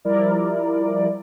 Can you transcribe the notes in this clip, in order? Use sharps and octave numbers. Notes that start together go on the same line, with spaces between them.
F3 G3 E4 A#4 D5